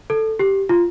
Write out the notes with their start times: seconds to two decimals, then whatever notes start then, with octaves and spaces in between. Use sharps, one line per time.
0.10 A4
0.39 G4
0.69 F4